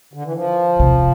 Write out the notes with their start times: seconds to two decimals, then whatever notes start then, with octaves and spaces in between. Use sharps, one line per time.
0.13 D3
0.23 E3
0.33 F3
0.79 C3